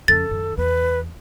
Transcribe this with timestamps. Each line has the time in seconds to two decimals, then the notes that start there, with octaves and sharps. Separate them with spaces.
0.08 F2 C#3 A4 A6
0.31 F#2 D#3
0.57 E2 B4